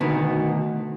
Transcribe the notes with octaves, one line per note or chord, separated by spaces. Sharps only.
D2 B2 D3 D#3 B3